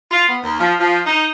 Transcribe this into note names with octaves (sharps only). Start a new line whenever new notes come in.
F4
B3
D#2
F3
F3
D#4